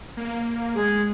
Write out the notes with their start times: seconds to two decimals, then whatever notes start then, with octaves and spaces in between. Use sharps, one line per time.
0.17 A#3
0.75 G#3 G#4